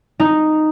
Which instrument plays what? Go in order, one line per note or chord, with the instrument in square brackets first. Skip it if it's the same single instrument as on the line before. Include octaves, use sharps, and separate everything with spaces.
[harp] D#4